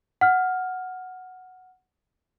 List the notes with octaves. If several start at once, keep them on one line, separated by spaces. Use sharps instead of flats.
F#5 F6